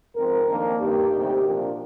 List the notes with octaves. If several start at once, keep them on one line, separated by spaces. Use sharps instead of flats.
G#2 F3 C4 A#4
F2 D#3 A#3 D4
G2 D#3 A#3 G4
D2 C3 D#3
A#2 F3 A#3 D4